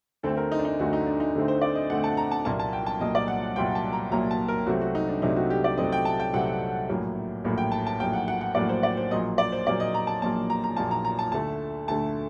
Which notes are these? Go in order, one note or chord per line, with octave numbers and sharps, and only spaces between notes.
D2 D3 A3 C4 A4
A#4
D#4
D4
D#4
D2 D3 A3 C4 F#4
D#4
D4
D#4
D2 D3 A3 C4
C5
D5
D#5
D2 D3 A3 C4 F#5
A5
A#5
A5
C2 A#2 F#3 A#3 A5
A5
G5
A5
C2 A#2 F#3 A#3 D#5
D5
F#5
C2 A#2 F#3 A#3 G5
A5
A#5
C2 A#2 F#3 A#3 A#5
A5
A#4
C2 C3 F#3 A3 C4 F#4
F#4
D#4
D4
C2 C3 F#3 A3 C4 D#4
F#4
G4
D5
C2 C3 F#3 A3 C4 D#5
G5
A5
G5
C2 C3 F#3 A3 C4 F#5
A#1 A2 F#3 A#3
A#1 A2 F#3 A#3
G5
A5
A5
A#1 A2 F#3 A#3 G5
F#5
F#5
F#5
A#1 A2 F#3 A#3 D5
C5
D5
C5
A#1 A#2 F#3 A#3 D#5
D5
C5
A#1 A#2 F#3 A#3 D5
D#5
A#5
A5
A#1 A#2 F#3 A#3 A5
A#5
A#5
A#1 A#2 F#3 A#3 A5
A#5
A#5
A5
D2 D3 A3 A5
D2 D3 A3 A5